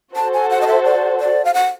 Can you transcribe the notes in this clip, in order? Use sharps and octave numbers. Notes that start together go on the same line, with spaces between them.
F#4 A4 C5 A5
G#5
F#5
D#5
E5
D5
D5
F5
F#5